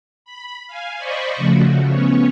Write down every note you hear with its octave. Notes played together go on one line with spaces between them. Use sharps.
B5
F5 G#5
C5 D5 D#5 B5 C#6
C#3 F3 A3 F#4
B3 C#4 C#5